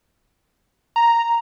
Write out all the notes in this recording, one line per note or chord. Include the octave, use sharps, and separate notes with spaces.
A#5